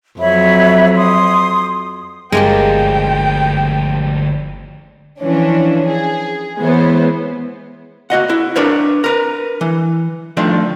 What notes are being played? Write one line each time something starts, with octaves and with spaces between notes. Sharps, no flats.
F2 F#3 C#5 E5 B5
C6 D#6
G1 D2 F3 G#3 A#3 G4 G5
E3 F3 C#4 D4
G#4
E3 G#3 B3 E4 C5 C#5
A#3 F#4 D#5 F#5
E4
D4 A#4 B4 C#5
A#4 B4
E3
D#3 F3 A3 D4